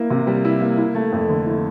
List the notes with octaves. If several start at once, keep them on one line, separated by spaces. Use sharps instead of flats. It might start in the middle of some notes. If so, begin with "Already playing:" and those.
Already playing: A#3 E4
C3
G3
E4
A#3
E4
A3
F2
D3
E4